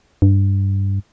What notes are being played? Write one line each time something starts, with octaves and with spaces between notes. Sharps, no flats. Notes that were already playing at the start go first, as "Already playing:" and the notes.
G2